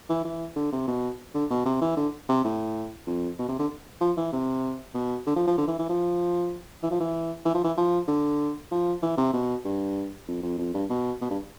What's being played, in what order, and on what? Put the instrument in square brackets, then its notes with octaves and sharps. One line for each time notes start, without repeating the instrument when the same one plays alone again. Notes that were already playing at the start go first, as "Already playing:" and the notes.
[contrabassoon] E3
E3
D3
C3
B2
D3
B2
C3
E3
D3
C3
A2
F2
B2
C3
D3
F3
E3
C3
B2
D3
F3
F3
D3
E3
E3
F3
E3
F3
E3
E3
F3
E3
F3
D3
F3
E3
C3
B2
G2
F2
F2
F2
G2
B2
B2
G2